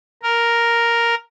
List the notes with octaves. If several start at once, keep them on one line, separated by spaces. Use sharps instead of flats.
A#4